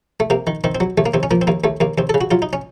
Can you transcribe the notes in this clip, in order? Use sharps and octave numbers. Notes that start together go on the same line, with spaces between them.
A3
C3 A#3
D#3
D#3 C4
C4
F#3
D#2 A3
A#3
D#2 C4
C#4
F3 A#3
C4
D#2 A#3
D#2 A3
D#2 A#3
D#2 C4
A4
C#3
F#4
F#3 F4
D#4
C#4